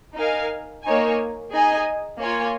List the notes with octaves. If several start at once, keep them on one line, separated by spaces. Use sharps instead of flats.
D#4 A#4 F5 G#5
A#3 D#4 C#5 G#5
D#4 G#4 D#5 G#5
A#3 F4 C#5 G#5